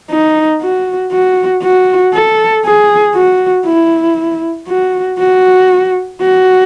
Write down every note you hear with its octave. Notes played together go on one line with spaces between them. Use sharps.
D#4
F#4
F#4
F#4
A4
G#4
F#4
E4
F#4
F#4
F#4